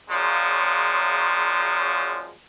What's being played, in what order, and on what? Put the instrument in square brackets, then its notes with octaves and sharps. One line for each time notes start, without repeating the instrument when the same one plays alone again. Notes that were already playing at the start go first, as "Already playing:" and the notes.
[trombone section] A#2 C#3 F3 F#3 G#3